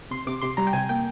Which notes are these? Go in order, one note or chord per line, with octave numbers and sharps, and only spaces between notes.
C3 C6
C3 D6
C3 C6
G3 A#5
G5
C3 G#5
A#3 G5